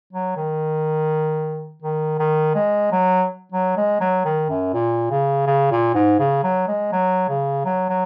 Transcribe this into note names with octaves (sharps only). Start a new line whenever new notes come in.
F#3
D#3
D#3
D#3
G#3
F#3
F#3
G#3
F#3
D#3
F#2
A#2
C#3
C#3
A#2
G#2
C#3
F#3
G#3
F#3
C#3
F#3
F#3